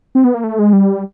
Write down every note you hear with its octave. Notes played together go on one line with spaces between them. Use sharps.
C4
B3
A#3
A3
G#3
G3